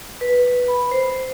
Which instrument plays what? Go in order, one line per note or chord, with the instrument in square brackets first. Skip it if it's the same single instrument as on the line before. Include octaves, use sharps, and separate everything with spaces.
[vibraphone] B4
B5
C5